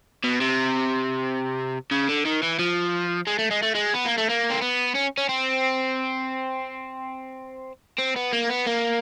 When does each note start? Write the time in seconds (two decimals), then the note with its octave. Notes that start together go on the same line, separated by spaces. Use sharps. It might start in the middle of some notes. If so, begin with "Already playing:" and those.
0.24 B2
0.41 C3
1.91 C#3
2.09 D3
2.26 D#3
2.43 E3
2.59 F3
3.27 G#3
3.39 A3
3.51 G#3
3.63 A3
3.75 G#3
3.94 B3
4.06 A#3
4.18 A3
4.30 A#3
4.51 C4
4.62 B3
4.95 C#4
5.18 C#4
5.29 C4
7.99 C4
8.16 B3
8.33 A#3
8.49 B3
8.66 A#3